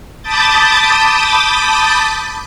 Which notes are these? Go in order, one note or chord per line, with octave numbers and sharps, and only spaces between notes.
A5 B5 D6 D#6 G6 A6